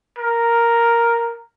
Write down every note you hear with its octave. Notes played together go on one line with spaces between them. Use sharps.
A#4